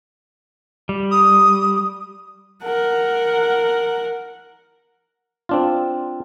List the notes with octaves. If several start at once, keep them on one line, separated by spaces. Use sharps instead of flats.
G3
D#6
A#4 F#5
C4 D4 F4